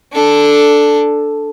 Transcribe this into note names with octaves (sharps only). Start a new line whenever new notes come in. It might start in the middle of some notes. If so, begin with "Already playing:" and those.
D4 A4